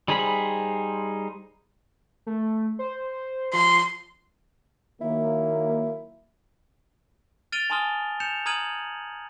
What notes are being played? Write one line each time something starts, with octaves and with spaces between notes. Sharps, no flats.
G3 D#4 G#4 C5 B5
A3
C5
F3 C6
D#3 F#3 A#3 E4
F6 A6 D7 D#7 F7 G7
G#5 A5 C6 D#6 F6 G7
G6 C#7 E7 F7
A#5 D#6 F6 G#6 D#7 F#7